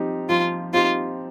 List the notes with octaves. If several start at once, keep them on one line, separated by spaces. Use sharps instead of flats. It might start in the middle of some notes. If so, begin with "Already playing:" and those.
Already playing: F3 C4 D#4 G4
F3 F4
C4 D#4 F4 G4